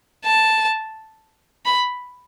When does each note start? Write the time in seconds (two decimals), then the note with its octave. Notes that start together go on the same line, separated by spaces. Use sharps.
0.25 A5
1.65 B5